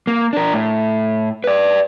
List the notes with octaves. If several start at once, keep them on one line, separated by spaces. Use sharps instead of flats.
A#3
D4 A#4
A2
B4 D5